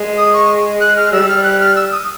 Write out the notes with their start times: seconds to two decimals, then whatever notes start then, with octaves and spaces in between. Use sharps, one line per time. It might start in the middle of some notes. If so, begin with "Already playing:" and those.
Already playing: G#3
0.18 D#6
0.33 C#6
0.81 F#6
0.97 F6
1.12 G3 E6
1.29 F6
1.44 F#6
1.60 F6
1.76 E6
1.92 D#6